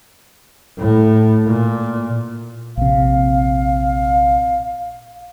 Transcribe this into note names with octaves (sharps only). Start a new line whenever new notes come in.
A2
A#2
A#1 C3 F5